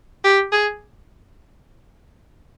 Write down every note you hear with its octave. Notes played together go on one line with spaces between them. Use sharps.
G4
G#4